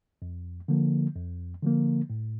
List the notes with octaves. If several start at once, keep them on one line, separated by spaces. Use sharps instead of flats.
F2
D3 F3 A#3
F2
D3 F3 A#3
A2